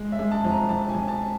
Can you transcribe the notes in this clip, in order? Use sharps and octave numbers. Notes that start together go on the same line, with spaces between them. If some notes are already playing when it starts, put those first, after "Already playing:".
Already playing: G#3
E5
G#3
A5
F2
A#5
F2 A5
G#5
F2
A5